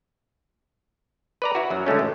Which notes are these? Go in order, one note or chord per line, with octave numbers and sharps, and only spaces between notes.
B4 D5 A#5
E4 F#4
F#2 F#3
D3 G#3 A3 C#4
A1